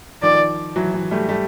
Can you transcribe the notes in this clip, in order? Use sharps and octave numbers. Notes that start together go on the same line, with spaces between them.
D#3 F3 D5
E3 F#3
E3
G3 A3
G3 A3